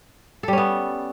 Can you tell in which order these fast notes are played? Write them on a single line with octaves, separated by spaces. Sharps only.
A4 G3 C#4 B3